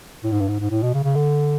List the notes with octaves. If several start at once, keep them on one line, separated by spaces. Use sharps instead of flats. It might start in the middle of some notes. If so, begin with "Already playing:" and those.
A2
G#2
G2
G#2
G#2
A2
B2
C#3
C#3
D3